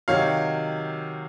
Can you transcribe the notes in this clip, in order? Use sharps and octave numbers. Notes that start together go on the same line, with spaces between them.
C3 D#3 F#3 C#5 F5